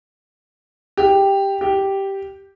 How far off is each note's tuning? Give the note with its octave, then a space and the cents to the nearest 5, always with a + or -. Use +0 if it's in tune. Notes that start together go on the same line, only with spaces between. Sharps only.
G4 +5
G4 -5